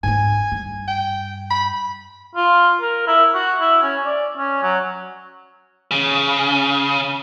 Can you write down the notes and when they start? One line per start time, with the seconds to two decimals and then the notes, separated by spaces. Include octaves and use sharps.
0.03 G#2 C4 G#5
0.52 G2
0.88 G5
1.50 B5
2.35 F4
2.81 A#4
3.07 E4
3.34 F#4
3.60 E4
3.82 C#4
4.05 D5
4.37 C#4
4.63 F#3
5.91 C#3